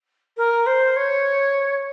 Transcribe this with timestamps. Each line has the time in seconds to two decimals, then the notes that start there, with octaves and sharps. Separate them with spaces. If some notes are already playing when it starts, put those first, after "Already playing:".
0.37 A#4
0.67 C5
0.96 C#5